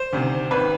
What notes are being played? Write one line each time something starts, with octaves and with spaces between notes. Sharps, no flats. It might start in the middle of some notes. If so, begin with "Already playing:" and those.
Already playing: C5
D2 C3 D#3
G#1 D#3 B4